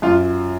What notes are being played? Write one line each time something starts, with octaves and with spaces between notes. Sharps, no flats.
F#2 F4